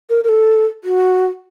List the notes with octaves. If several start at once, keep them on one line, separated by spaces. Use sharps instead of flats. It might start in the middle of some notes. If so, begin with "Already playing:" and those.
A#4
A#4
A4
F#4